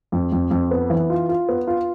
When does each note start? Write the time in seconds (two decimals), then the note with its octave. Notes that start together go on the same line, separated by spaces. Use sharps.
0.12 F2
0.32 F2
0.51 F2
0.71 B3
0.90 E3
1.10 F4
1.29 F4
1.49 B3
1.67 F4